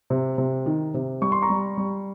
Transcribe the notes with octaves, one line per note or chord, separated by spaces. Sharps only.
C3
C3
D#3
C3
G3 C#6
C6
A#5 C#6
G3
G3